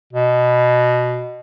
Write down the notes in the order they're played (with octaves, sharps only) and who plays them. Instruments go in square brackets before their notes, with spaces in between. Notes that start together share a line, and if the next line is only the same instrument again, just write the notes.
[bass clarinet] B2